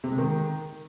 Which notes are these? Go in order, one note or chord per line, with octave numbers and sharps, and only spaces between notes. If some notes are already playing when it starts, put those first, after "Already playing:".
C3
G#3
D#3